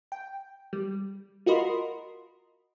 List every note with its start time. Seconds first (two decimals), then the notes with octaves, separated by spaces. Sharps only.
0.12 G5
0.73 G3
1.46 F4 F#4 A#4 D#5 B5 C6